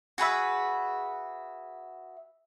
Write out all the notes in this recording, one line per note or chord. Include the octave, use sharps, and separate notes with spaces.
F#4 G#4 B4 E5